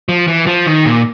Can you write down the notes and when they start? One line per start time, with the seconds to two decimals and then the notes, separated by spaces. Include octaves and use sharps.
0.09 F3
0.28 E3
0.47 F3
0.66 D#3
0.86 A#2